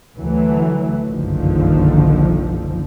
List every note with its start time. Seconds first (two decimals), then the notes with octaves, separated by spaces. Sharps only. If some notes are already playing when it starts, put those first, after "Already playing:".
0.18 D2 E3 F#3 A3
1.09 F#1 B1 G2 D3 D#3 F3